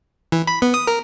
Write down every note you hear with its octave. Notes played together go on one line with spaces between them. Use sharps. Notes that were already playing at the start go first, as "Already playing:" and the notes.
E3
B5
B3
D#6
A#4